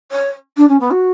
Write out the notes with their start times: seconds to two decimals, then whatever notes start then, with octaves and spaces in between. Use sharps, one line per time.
0.12 C#5
0.57 D4
0.69 C#4
0.80 B3
0.91 F#4